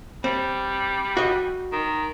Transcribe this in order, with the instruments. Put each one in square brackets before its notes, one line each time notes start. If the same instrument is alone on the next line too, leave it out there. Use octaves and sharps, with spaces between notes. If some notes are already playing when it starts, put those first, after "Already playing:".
[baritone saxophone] G3 [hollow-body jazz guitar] C4
[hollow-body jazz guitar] F#4 D#5
[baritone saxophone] D#3